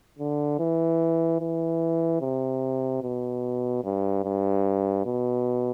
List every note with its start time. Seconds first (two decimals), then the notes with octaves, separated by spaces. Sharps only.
0.19 D3
0.60 E3
1.40 E3
2.21 C3
3.02 B2
3.84 G2
4.24 G2
5.06 B2